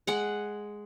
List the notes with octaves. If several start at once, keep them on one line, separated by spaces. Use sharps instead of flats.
G#3 G#4 F#5